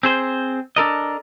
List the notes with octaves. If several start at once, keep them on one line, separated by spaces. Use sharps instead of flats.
C4 G#4 C5
D4 A4 A#4 D#5